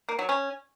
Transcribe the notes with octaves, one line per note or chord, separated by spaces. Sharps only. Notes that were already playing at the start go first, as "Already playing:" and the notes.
A#3
F#3
C#4